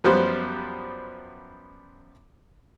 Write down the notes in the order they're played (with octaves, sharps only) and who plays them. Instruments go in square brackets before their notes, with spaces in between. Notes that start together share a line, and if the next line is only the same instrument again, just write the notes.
[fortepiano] F#2 F3 G3 B3 C5